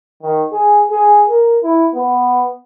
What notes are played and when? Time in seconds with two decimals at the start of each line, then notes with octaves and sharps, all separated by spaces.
0.23 D#3
0.53 G#4
0.91 G#4
1.29 A#4
1.63 E4
1.94 B3